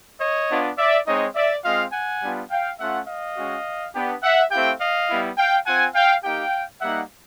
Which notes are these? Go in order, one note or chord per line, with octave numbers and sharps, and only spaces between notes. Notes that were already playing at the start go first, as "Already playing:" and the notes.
C#5 D#5
B3 D4 F4
D5 E5
G#3 C4 D#4 C#5 D#5
D5 E5
G#3 C4 F4 D#5 F5
F#5 G#5
G3 B3 D4 F4
F5 G5
A3 C#4 F4 E5 F#5
D#5 F5
G#3 C#4 F#4
B3 D4 G4
E5 F#5
A3 C4 E4 G4 F5 G5
D#5 F5
G3 B3 E4
F5 G5
C4 F4 F#5 G#5
F5 G5
A#3 D#4 G4 F5 G5
G3 A#3 D#4 E5 F#5